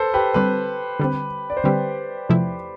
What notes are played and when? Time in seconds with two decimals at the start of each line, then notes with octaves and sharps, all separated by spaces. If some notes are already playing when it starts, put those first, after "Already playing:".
Already playing: A4 B4 C5
0.14 G4 B4
0.34 D3 G3 C4 G4 B4
1.00 D3 G3 C4
1.50 D5
1.57 C5
1.64 D3 G3 C4 G4 B4
2.29 E2 C3 F3 A3 E4